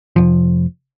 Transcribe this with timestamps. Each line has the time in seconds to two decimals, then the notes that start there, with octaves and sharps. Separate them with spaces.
0.16 F1 F3